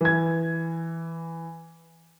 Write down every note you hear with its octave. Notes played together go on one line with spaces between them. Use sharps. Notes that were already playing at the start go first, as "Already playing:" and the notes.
E3 G#6